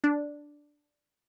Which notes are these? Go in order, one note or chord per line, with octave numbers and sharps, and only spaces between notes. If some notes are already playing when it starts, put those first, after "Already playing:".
D4